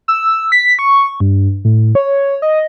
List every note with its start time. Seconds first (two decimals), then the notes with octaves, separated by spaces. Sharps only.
0.08 E6
0.52 B6
0.79 C#6
1.20 G2
1.65 A2
1.95 C#5
2.42 D#5